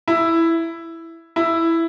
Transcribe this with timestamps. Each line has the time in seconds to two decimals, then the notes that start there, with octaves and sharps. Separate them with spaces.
0.08 E4
1.36 E4